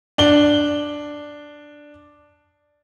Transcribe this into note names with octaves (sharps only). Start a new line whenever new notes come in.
D4 G7